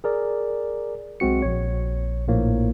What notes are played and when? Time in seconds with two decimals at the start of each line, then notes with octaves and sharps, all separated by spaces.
0.04 G#4 A#4 D5
1.20 B1 G#3 C4 F#4 C#7
1.42 A#1 C#5
2.27 A#1 A2 F3 A#3 C#5